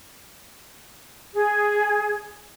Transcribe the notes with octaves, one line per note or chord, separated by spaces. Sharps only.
G#4